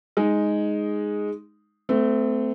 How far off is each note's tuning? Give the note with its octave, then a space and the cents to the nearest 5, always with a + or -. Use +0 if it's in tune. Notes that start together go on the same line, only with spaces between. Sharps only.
G#3 +0 D#4 +0
A3 +0 C4 -35